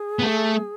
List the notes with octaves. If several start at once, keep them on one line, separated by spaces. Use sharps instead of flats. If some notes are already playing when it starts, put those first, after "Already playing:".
Already playing: G#4
B3
A3